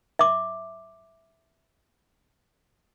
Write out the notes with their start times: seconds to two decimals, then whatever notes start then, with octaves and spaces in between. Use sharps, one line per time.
0.19 E5 D6